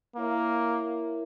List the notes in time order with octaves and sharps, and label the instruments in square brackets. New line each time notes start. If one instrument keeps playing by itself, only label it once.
[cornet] A#3 [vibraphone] E4 A#4 C#5 E5